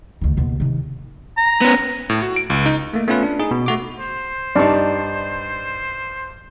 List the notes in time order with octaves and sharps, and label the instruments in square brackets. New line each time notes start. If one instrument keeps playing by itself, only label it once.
[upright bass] D2 D#3
D#2 B2
C3 D#3
[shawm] A#5
[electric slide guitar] B3 C#4
[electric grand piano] A2
F#4
D7
C#2
D#4
[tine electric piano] A3 A#3
A3 B3 C#4 F4 B4 F5
D4
D#4 G#4
B2
A3 F#4 D6
[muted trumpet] C5
[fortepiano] G2 D#4 [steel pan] D5 A5 C#6